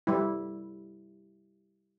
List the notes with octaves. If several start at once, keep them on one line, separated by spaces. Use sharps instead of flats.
G3 E4